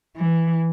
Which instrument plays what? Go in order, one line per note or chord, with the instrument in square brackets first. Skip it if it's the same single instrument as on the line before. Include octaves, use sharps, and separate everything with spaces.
[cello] E3